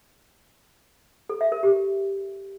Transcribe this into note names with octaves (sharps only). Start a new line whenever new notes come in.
A4
E5
A#4
G4